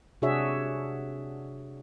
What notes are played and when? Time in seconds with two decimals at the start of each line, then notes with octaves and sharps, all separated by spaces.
0.22 C3 D4 F#4 G#4 C#5 E5